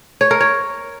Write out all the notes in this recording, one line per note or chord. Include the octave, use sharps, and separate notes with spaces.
C#5
A#4
C#5